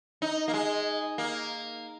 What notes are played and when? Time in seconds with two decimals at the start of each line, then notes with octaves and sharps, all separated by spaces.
0.22 D#4
0.48 A#3
0.53 G#3
1.18 A#3